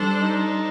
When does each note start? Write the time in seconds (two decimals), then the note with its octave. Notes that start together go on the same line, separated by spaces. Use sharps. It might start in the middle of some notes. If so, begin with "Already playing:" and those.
Already playing: G3 D4 A4 C5
0.20 D#4